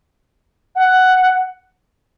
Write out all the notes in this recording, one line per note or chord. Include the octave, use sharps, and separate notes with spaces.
F#5